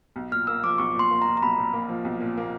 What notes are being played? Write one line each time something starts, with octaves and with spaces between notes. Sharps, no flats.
B1
A#2 F6
A#3 E6
F3 D6
B1 C#6
A#2
C6
A#3
A#5
F3
A#5
B1 B5
A#2
A#3
F3
B1
A#2
A#3